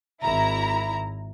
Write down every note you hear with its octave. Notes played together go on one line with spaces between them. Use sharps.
G#1 E4 A#5